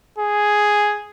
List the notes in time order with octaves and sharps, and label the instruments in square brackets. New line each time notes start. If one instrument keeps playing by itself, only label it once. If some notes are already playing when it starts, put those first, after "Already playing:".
[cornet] G#4